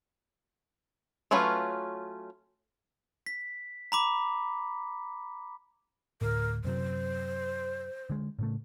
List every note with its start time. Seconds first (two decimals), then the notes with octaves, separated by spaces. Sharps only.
1.31 F#3 A3 C#4 F4 B4
3.26 B6
3.92 A#5 B5 D6
6.21 D2 A2 A#4
6.64 F#2 C3 F#3 C5
8.10 D3 G#3
8.39 A2 C#3 A3